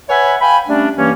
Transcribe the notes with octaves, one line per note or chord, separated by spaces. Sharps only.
B4 C#5 E5 F#5 G#5 B5
F5 G5 G#5 B5
G3 A3 C#4 D4
G2 E3 A#3 C#4